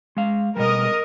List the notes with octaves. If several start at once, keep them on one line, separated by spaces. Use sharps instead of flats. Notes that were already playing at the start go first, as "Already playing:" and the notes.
G#3 F5
B2 G3 A#4 D#5